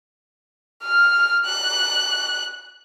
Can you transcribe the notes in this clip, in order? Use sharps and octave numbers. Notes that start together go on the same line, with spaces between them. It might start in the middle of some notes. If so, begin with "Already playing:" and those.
F6
F#6